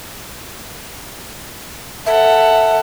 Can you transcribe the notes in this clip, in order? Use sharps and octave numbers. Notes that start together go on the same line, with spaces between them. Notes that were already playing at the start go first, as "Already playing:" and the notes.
A4 E5 F#5